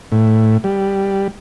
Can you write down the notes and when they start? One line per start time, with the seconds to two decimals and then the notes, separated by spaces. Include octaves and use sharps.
0.12 A2
0.64 G3